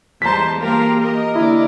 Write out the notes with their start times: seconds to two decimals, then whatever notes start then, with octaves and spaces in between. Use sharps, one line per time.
0.22 E2 G3 G#3 C5 A5 A#5 B6
0.59 A#3 F4 G4 A#4 F5
1.02 A#4 D#5
1.35 D3 A#3 E4 D5